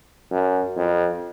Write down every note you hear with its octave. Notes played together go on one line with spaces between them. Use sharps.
F#2
F2